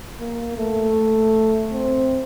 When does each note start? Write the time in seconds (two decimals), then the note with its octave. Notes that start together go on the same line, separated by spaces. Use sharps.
0.19 A#3
0.58 A3
1.73 C4